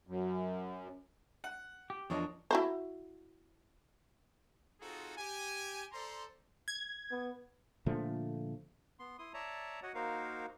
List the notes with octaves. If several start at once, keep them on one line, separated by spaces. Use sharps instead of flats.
F#2
F#5
G4
E2 F3 D4 A#4 C#5 D#5
E4 F#4 C5
C4 D#4 F4 F#4 G#4 A4
G4 G#5
A4 C5 D5 A#5 C6
G#6
B3
A#2 D3 F3 A3
B3 C6
E4 C6 D#6
C#5 D5 E5 A5 A#5
F#4 C#5 D#5 F#5
A#3 D#4 F#4 A#4 C5 F5